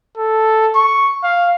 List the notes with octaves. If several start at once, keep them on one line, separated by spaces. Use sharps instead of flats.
A4
C#6
F5